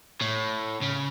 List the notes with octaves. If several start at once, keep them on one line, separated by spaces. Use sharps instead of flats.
A2
C#3